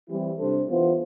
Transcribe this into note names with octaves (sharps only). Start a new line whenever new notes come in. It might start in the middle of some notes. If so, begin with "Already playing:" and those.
E3 G3 C4 E4 G4
C3 G3 D4 A4 C5
E3 B3 F4 C5